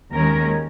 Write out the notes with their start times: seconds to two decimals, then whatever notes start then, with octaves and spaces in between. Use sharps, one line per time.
0.11 D#2 D#3 G#3 C#4 A#4